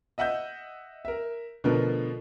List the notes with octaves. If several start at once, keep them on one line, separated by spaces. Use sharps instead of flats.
D#5 E5 F#5 E6 G6
A#4 E5
B2 D3 F3 A3 B3 A#4